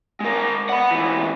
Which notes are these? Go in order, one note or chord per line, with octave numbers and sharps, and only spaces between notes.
G#3 A#4
F#5 B5
G#2 E3